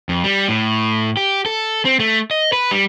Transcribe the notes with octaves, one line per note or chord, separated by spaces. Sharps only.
F2
G3
A2
G4
A4
C4
A3
D#5
B4
G3